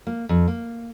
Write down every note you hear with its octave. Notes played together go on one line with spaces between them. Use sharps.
A#3
F2
A#3